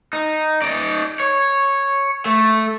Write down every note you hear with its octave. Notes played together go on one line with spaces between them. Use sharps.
D#4
D#4 D5
C#5
A3